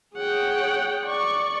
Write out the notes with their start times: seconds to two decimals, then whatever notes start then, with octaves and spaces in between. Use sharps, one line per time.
0.17 G#4 C#5 F#5 G5
1.06 D5 C#6